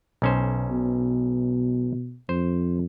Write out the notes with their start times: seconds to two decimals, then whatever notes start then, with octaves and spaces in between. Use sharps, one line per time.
0.22 B1 C#4 C5
0.68 B2
2.29 F2 C5